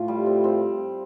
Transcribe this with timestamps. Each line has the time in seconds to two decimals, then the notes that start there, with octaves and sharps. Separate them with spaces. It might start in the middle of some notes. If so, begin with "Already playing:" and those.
Already playing: A2 A3 F4
0.08 G3
0.26 C4
0.44 C4